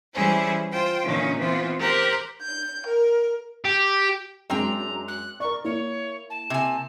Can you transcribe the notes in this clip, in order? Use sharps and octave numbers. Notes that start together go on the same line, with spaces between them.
E3 G3 C#4 E4 G#4 C5
F4 C5 G5
A#2 D3 E3 C#4 D#4
E3 B3 C4 F4
G4 A#4 C5 F#6
G6
A#4
G4
F#2 G#3 C4 D4 G5 A#5
F#6
A#4 D5 C#6
A#3 E4 C#5
A5
C3 G#5